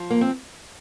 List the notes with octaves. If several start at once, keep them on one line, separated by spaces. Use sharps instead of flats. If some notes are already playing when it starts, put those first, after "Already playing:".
Already playing: F3
A#3
C4